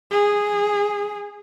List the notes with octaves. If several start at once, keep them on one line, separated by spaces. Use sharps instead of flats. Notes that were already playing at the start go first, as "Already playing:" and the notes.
G#4